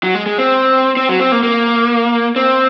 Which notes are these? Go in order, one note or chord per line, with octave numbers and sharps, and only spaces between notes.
F#3
G#3
G#3
C4
C4
F#3
C4
A#3
A#3
C4